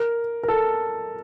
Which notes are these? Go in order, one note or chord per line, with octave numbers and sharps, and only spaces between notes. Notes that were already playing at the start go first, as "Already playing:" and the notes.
Already playing: A#4
A#4
A4